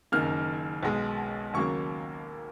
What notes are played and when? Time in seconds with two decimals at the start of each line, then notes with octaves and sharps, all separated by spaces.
0.12 F#1 F#2 D#3 A#3 F6
0.83 B1 B2 G#3
1.54 D#2 C#3 F#3 A#3 C#6